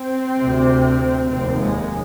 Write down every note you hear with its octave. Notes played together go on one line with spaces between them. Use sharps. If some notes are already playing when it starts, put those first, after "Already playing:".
Already playing: C4
D2 C3
F1 D#2 C4
G#3